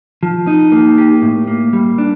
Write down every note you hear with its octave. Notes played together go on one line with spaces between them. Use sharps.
F3
D#4
A#3
G4
A2
A#3
G3
D4